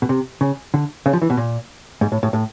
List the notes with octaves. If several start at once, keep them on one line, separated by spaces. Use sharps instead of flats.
B2
C3
C#3
D3
C#3
F3
E3
B2
A#2
G#2
A2
A2
A2